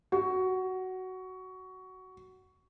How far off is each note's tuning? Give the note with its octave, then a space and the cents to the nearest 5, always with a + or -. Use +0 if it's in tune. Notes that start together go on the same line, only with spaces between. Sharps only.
F#4 +10